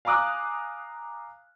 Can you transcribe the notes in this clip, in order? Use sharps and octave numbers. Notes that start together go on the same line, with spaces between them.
F5 G#5 A#5 D6 D#6 F#6